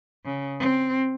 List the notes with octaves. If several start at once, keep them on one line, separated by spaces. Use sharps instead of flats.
C#3
C4